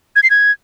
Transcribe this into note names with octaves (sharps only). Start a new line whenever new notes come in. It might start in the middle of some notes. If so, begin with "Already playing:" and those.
G#6
C7
G#6